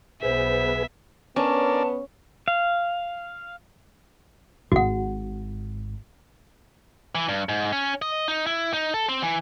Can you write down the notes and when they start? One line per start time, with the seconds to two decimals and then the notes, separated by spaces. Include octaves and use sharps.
0.23 B1 B3 G#4 B4 C5 E5
1.36 B3 C#4 D4 A#4 D5 A5
2.48 F5
4.72 G#1 F#4 F#5
7.15 E3
7.29 G2
7.49 G#2
7.73 C#4
8.02 D#5
8.28 D#4
8.47 E4
8.73 D#4
8.94 A4
9.09 C4
9.22 E3